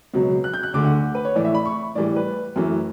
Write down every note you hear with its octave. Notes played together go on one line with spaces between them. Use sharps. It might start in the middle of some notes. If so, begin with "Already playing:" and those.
C#2 B2 F#3
F#6
G6
F#6
D2 D3 A3 D6
F#5
B4
C#5
A2 E3 A3 D5
E5
B5
C#6
A2 E3 G3 D5
B4
F#2 E3 A3